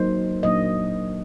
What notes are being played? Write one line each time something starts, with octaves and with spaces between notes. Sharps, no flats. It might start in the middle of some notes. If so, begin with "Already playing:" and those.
Already playing: F#3 A#3 D#4 C5
A#2 F#3 A#3 D4 D#5